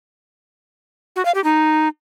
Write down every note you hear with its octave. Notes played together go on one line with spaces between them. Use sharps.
F#4
F5
G4
D#4